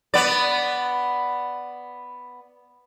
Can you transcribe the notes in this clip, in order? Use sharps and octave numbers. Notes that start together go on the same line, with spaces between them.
B3 D5